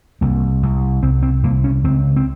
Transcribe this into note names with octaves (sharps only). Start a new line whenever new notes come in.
C2 A#3
C2
C2 C4
C4
C2 A#3
C#4
C#2 C4
C4